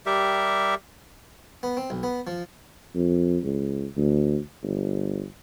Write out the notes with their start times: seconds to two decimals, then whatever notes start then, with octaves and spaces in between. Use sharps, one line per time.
0.06 G3 G4 A#4 E5
1.63 B3
1.77 C4
1.90 B1
2.03 B3
2.27 F3
2.95 F2
3.44 C#2
3.97 D2
4.63 G1